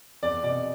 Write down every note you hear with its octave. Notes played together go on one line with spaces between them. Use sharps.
E2 D5
B2 D5